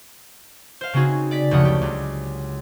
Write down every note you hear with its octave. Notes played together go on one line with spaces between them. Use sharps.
C5 F5
C#3 C4 C#4 D#4 F#4 G#4
D5 B6
F#1 D2 C#3 F3 F#5 D#6
G4
C#2